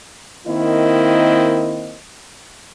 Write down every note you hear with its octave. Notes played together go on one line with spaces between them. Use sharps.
D#3 A#3 C4 E4 D#5